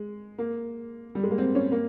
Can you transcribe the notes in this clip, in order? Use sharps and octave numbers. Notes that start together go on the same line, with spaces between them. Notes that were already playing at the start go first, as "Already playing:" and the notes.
Already playing: G#3
A#3
G3
G#3
A#3
C4
C#4
A#3